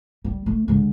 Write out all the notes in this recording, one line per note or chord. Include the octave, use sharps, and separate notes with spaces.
G3
A3
D3 G#3